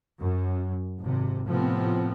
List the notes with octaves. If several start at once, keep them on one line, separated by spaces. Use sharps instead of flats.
F#2
G#1 C3
A2 C3 F3 B3 C4